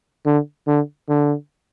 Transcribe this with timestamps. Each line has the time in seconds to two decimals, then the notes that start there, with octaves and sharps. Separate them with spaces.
0.26 D3
0.67 D3
1.09 D3